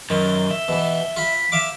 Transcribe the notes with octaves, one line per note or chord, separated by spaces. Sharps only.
F#2 D#3 G7
E5
B2 E3
F4 B5 B6
E5 F5 D6